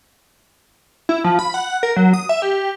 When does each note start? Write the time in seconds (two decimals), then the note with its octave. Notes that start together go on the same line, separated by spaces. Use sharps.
1.09 E4
1.24 F3
1.39 B5
1.54 F#5
1.83 A#4
1.96 F#3
2.13 D#6
2.29 E5
2.42 G4